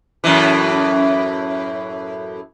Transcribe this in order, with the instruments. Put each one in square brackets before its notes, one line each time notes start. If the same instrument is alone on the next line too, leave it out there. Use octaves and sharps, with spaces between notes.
[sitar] F#2 A2 E3